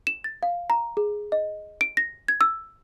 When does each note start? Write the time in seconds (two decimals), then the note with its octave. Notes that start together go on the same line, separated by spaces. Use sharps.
0.07 E7
0.24 A6
0.43 F5
0.70 A#5
0.97 G#4
1.32 D#5
1.81 D7
1.97 A#6
2.28 G#6
2.41 E6